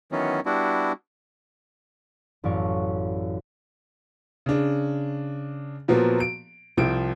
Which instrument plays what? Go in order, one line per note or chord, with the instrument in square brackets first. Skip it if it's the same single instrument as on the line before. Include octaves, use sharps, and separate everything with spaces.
[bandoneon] D#3 E3 F#3 B3 C#4
G3 B3 D4 E4 F#4
[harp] A1 F#2 E4 D5 F5 C#6
[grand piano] C#3 D4
A#2 F3 F#3 A#3 B3
D7
C2 F3 C4 D7